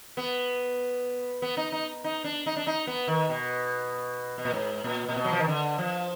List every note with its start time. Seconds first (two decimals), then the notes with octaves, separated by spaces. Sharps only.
0.17 B3
1.42 B3
1.57 D#4
1.72 D#4
2.04 D#4
2.24 D4
2.46 D#4
2.56 D4
2.67 D#4
2.87 B3
3.07 D#3
3.29 B2
4.38 B2
4.45 A#2
4.53 G#2
4.84 A#2
5.08 A#2
5.16 B2
5.25 F#3
5.32 F3
5.40 D#3
5.48 D3
5.78 F3